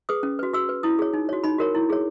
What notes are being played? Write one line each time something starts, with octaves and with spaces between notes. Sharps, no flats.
G#4 B4 D#6
C#4
F#4 B4
F#4 E6
B4
E4 D#6
G#4 C#5
D#4
F#4 C#5
D#4 B5
F#4 A#4 C#5
E4
G#4 C#5